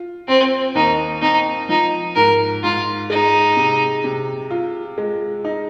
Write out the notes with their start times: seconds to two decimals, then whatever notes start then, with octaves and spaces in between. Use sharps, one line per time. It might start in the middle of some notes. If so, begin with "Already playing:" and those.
Already playing: F4
0.28 C4 C5
0.75 D#2 D#4
1.22 C4 D#4
1.69 F3 D#4
2.16 G#2 A#4
2.64 G#2 F4
3.10 G#3 D#4
3.57 C3
4.04 C3
4.51 F4
4.98 G#3
5.44 D#4